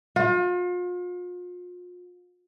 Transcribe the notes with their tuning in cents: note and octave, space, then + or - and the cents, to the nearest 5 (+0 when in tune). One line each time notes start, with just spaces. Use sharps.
F4 +40